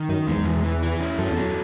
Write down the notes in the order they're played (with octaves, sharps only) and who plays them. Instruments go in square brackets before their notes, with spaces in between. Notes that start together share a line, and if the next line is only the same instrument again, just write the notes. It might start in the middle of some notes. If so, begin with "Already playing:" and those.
Already playing: [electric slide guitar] D#3
[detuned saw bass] F#2 [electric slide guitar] D#4
[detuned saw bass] E2 [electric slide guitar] G#3
[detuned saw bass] E2
[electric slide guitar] E3
E3
E4
C#4
[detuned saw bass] F#2 [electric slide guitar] A4
[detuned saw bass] E2
[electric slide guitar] F#3